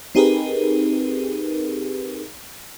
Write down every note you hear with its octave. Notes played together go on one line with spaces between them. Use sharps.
C4 D#4 G4 G#4 A#4 B4